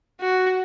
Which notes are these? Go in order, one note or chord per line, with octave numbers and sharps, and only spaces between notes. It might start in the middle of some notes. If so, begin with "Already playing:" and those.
F#4